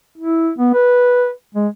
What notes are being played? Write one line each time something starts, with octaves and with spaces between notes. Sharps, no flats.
E4
B3
B4
G#3